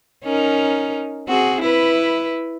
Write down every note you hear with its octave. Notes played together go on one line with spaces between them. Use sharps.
C#4 D#4 A#4
C4 F#4 G#4
E4 B4